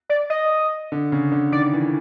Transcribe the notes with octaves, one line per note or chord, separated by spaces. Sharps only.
D5
D#5
D3
C#3
D3
D#3 D5
E3